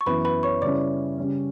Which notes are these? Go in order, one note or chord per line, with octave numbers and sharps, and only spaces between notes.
C#6
F#2 E3 B3 E4 B4 B5
B4 B5
C#5 C#6
C#3 G3 C#4 E4 D5 D6
C#3 G3 C#4